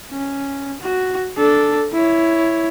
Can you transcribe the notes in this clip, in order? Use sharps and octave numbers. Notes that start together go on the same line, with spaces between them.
C#4
F#4
D4 A4
E4 C#5